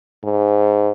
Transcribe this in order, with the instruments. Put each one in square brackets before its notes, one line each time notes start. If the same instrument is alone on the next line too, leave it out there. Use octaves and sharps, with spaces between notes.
[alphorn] G#2